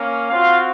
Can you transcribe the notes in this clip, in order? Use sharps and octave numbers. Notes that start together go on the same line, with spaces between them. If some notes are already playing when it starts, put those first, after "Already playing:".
Already playing: A#3 C#4
C4 F4 F#4 F5